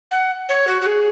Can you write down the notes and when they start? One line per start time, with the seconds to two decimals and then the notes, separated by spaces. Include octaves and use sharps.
0.11 F#5
0.48 C#5
0.67 F#4
0.81 F#4
0.86 G#4